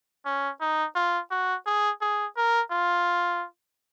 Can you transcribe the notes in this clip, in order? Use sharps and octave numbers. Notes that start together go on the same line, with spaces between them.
C#4
D#4
F4
F#4
G#4
G#4
A#4
F4